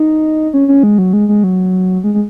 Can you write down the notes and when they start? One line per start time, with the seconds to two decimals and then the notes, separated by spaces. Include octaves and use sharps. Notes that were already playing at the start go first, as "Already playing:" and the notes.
Already playing: D#4
0.54 C#4
0.68 C#4
0.83 G#3
0.98 F#3
1.13 G#3
1.28 G#3
1.44 F#3
2.04 G#3
2.14 G#3